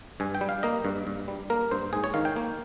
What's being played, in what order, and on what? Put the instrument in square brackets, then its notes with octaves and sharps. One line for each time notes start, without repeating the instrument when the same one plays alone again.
[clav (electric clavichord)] G2 G#5
G5
G3
F5
A#3 D#5
G2
G2
G3
A#3 A#4
G2 C5
G#2 G#4
C#5
D#3 F5
G5
A#3